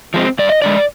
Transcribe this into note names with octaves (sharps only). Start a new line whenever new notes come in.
F3 G#3 C4
G2 D5
D#5
D3 G#3 D5